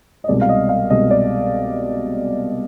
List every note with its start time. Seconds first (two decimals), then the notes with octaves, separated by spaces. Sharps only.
0.24 D#5
0.28 C2 B2 G#3 D5
0.41 F5
0.49 D#5
0.69 F5
0.90 C2 B2 G#3 D#5
1.10 D5